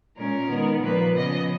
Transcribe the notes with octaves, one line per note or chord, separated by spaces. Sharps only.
A#2 G#3 C#4 A#4
D#3 G#3 B3
A#2 F3 A#3 B4
C#3 F3 B3 D#5